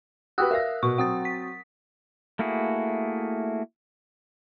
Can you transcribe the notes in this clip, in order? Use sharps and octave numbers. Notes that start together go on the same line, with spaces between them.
F#4 G4 B4 D#6 E6 F#6
A#4 E5 F5 A#6
B2 C#6
F#3 C4 F#5 D#6 A6
B6
A3 A#3 E4 F#4 G#4